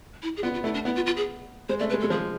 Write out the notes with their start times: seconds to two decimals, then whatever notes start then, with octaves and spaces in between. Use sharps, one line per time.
0.22 E4
0.37 G#4
0.43 B3 F4
0.54 F4
0.64 A3 E4
0.74 D4
0.85 B3 E4
0.95 F4
1.06 F4
1.17 G#4
1.69 G#3 C5
1.79 A3 D5
1.90 B4
1.94 G#3
2.00 A4
2.04 G#3
2.10 F3 G#4